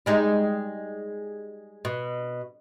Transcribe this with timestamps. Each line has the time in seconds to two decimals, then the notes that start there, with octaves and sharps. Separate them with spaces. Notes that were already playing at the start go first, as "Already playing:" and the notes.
0.06 G3 G#3 D#4
1.85 B2